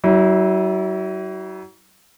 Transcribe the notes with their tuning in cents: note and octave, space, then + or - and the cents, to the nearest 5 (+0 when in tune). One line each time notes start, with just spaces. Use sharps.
F#3 +35 E4 -20